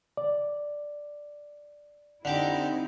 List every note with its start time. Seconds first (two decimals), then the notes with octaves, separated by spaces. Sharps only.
0.17 D5
2.25 D3 C4 D#4 E4 G4 D6